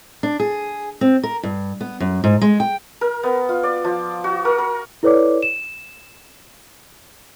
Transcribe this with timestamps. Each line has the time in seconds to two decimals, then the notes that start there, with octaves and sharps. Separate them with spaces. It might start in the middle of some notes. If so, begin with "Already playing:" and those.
0.23 D4
0.40 G#4
1.01 C4
1.23 A#4
1.43 G2
1.81 B3
2.00 F#2
2.24 G#2
2.41 G#3
2.60 G5
3.01 A#4
3.23 B3
3.49 F4
3.63 D5
3.84 F3
4.24 F#4
4.45 A#4
4.58 A#4
5.03 E4 A4 B4 C#5 D5 D6
5.43 E7